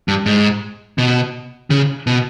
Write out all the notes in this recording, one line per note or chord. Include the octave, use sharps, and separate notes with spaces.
G2
G#2
B2
C#3
B2